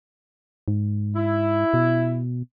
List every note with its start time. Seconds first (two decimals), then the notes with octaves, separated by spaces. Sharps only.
0.68 G#2
1.16 E4
1.74 B2